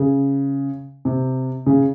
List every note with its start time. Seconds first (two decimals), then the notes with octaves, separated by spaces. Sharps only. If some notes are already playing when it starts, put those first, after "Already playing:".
Already playing: C#3
1.05 C3
1.66 C#3